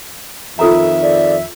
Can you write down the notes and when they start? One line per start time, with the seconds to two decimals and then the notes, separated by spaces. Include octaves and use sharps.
0.59 F2 D#3 F4 A4 E5 A#5
1.02 D5